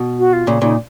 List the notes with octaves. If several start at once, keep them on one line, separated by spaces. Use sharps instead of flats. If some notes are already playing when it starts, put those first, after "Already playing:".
Already playing: B2
F#4
F4
A#2 C#3
A#2 C#3 D#4